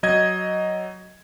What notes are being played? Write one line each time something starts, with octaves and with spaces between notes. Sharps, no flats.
F#3 D#5 G#6